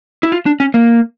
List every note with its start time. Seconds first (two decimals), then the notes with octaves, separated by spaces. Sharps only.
0.23 E4
0.32 F4
0.46 D4
0.60 C#4
0.74 A#3